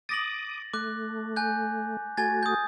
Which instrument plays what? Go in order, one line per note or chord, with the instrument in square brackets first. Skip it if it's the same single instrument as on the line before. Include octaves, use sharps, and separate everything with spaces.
[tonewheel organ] D6 D#6 [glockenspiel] A6 A#6 F#7
[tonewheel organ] A3 [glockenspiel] D6 F#6
[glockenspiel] G#5 F#6 G6
[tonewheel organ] A3 F#4 [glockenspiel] G#5 G#6 A6
[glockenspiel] D#6 G6